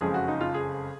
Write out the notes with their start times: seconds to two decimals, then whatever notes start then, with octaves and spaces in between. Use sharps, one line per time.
0.01 F#1 F2 C#3 F3 G#3 G#4
0.14 F#4
0.28 D#4
0.41 F4
0.54 G#4